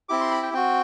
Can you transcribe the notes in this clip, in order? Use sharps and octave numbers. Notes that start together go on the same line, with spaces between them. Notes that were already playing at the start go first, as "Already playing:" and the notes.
C4 E4 G4 D6
C6
B5
G5
C4 F#4 G5